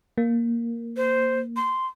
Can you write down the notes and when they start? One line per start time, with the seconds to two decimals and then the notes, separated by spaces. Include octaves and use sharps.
0.18 A#3
0.97 C5
1.56 C6